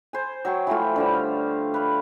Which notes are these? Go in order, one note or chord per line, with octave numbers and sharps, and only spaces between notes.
C5 G#5
F#3 G5 C#6
E3 F3 A3 F4
D3 G3 C5
F5
B4 F5